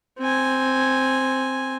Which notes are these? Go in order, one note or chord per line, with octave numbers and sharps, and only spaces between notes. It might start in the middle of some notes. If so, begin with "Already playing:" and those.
C4 G#5